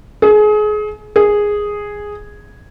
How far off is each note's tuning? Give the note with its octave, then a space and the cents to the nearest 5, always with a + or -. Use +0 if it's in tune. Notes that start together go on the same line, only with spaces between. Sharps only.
G#4 +30
G#4 -5